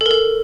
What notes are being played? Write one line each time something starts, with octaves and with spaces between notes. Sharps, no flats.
A4
A#4
A4